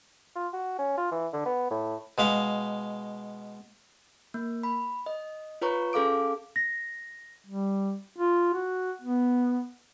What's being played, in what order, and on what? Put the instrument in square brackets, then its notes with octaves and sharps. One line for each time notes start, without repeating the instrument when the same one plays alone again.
[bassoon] F4
F#4
C#4
F4
E3
D3
B3
A2
[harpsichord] B2 G#3 F5
[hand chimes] A#3
B5
D#5
F4 B4 C#5 A#5 C#6
C#4 G#4 A4 F5 D6 D7
[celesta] A#6
[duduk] G3
F4
F#4
B3